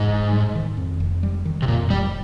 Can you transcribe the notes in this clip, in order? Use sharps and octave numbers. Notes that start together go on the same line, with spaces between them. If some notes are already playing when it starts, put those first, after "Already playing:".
Already playing: F2 G#2
F1
G3
D#3
F2
F1
G3
D#3
C3
F2 A#2
F1 G3